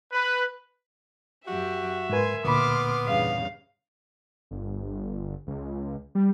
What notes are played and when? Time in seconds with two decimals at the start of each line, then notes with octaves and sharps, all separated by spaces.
0.12 B4
1.47 F#2 F#4 G4 E5
2.10 G#2 A#4 B4 G#5 C6
2.45 D2 A#2 B3 B5 C6 D6 F6
3.06 E2 G2 C#3 F5
4.51 G1
5.47 C#2
6.15 G3